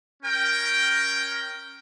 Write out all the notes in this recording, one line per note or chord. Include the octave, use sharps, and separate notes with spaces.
C#4 A#4 G5